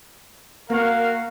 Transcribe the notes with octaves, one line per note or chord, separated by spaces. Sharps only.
A#3 F#4 A#4 F5